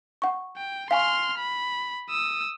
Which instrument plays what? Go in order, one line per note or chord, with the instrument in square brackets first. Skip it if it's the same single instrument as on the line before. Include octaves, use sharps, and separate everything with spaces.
[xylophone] F#5 C#6
[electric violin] G5
[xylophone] F5 G#5 C#6 [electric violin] C6 F6
[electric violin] B5
D#6 E6